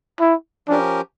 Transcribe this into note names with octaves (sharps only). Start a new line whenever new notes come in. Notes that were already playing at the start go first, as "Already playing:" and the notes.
E4
F3 C#4 D4 G4 A#4